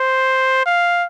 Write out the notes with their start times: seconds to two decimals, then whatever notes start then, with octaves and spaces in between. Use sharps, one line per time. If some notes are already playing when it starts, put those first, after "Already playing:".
Already playing: C5
0.66 F5